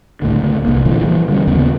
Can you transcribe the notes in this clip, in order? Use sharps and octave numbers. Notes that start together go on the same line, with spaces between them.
C#2 A2 D3
C2 A#3
A#2 D3 E3 F3
E3 G3
D3 G3 C#4
D#2 C#3 B3